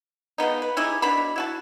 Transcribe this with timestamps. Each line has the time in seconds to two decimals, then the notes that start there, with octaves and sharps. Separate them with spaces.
0.38 F3 G#3 B3 D#4
0.62 B4
0.77 D#4 E4 G4 G#4
1.02 B2 F#3 D4 B5
1.36 E4 F#4 A5